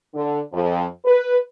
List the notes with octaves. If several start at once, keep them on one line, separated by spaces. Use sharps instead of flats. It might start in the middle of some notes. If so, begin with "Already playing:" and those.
D3
F2
B4